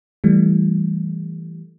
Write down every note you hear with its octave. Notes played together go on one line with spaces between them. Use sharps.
E3 G3 A3